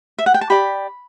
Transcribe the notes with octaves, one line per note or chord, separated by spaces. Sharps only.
E5
F#5
G5
A5
G4 D5 B5